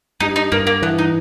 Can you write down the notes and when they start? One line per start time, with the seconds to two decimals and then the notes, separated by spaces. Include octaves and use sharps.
0.20 G2 D#4
0.36 D#4
0.52 G2 A#3
0.67 A#3
0.82 E3 B3
0.99 D#4